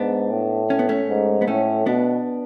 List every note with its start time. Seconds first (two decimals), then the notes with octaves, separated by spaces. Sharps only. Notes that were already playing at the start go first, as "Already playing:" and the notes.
Already playing: G#2 B3 D4
0.31 A2
0.70 C#4
0.79 B3
0.89 A3 C#4
1.09 G#2
1.42 B3
1.48 A2 A3 C#4
1.86 B2 B3 D4